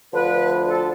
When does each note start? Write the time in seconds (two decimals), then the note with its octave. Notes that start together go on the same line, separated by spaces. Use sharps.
0.13 D2 D3 F3 B4
0.68 A4